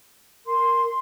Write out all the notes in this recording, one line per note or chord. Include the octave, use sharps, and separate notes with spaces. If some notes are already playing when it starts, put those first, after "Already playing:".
A#4 C6